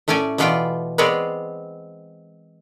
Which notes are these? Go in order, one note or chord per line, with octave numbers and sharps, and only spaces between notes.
A2 A3 C#4 D5 G#5
B2 E3 B3 F4 D5 G5
G#3 B3 C4 B4 C#5 D5